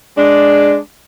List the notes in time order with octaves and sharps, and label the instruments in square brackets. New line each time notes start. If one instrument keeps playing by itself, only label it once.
[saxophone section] G#3 D4